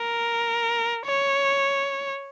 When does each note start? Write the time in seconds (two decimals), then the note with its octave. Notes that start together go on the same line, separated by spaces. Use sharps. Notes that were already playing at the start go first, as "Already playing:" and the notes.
Already playing: A#4
1.06 C#5